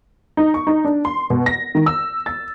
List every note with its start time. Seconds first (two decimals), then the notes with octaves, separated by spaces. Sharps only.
0.37 D#4
0.54 C#6
0.67 D#4
0.85 D4
1.05 C6
1.30 B2
1.46 A#6
1.75 D#3
1.86 E6
2.26 A6